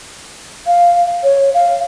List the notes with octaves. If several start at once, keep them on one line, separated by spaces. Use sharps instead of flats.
F5
C#5
F5